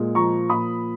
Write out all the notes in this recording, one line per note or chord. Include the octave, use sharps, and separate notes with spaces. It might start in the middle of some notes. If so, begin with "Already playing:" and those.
Already playing: A#2 G#3
F3 A#5 C#6
A#2 B5 D#6